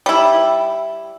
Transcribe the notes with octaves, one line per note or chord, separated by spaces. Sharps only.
G3 E4